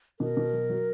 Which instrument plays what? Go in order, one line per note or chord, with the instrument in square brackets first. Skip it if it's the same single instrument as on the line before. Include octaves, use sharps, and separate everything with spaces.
[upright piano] B2 [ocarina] A#4
[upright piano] B2
F#3
F#3